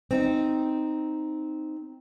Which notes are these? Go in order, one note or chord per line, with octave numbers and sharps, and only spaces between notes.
C4 D#4